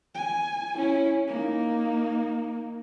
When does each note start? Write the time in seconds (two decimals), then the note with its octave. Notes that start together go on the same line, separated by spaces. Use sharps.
0.14 G#5
0.76 C#4 E4
1.28 A#3 D#4